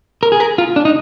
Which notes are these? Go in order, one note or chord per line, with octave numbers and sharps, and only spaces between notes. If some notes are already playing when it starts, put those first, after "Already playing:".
A#4
G#4
A#4
F4
D4
D#4